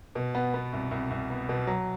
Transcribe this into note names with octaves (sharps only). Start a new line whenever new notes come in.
B2
B3
B3
C2
C2
C2
B3
B2
F#3